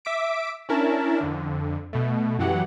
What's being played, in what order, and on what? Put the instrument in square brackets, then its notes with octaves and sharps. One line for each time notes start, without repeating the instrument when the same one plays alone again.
[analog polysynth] E5 D6 B6 D7
C#4 D4 E4 A#4 A5
F2 D3
B2 A3
F#2 E3 F#3 G4 F#5